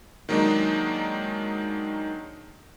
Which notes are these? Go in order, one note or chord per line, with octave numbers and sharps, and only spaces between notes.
D#3 F#3 G#3 A#3 D4 D#4